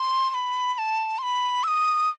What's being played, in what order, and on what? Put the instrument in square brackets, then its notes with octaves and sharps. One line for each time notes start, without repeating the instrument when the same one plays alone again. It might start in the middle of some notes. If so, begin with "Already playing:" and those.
Already playing: [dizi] C6
C6
B5
B5
A5
C6
B5
E6
D#6